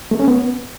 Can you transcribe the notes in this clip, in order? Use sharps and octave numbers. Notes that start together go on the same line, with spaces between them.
A3
C#4
B3